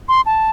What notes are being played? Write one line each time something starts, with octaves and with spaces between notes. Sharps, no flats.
C6
A5